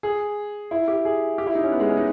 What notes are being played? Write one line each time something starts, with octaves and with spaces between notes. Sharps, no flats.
G#4
E4
G4
G#4
G4
E4
D#4
C#4
B3
G#3
C#4
D#4